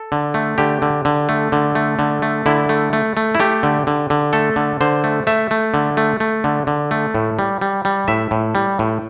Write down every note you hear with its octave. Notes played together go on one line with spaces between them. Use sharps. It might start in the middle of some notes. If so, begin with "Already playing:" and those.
Already playing: A4
D3
A3
D3 G4
D3
D3
A3
D3
A3
D3
A3
D3 E4
A3
A3
A3
E4
A3 G4
D3
D3
D3
A3 A4
D3
D3 C5
A3
A3 E5
A3
D3
A3
A3
D3
D3
A3
A2
G3
G3
G3
A2 E5
A2
G3
A2